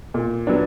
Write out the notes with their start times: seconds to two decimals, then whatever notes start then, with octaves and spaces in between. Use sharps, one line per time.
0.14 A#2
0.47 F#3 B3 D4